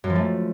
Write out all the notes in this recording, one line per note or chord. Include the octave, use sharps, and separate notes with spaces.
F#2
F3
A3